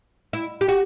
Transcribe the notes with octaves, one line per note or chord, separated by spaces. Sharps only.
E4
G4
F#4